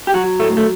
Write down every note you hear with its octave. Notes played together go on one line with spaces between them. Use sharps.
G4
F#3 F#4
A2 A3
A3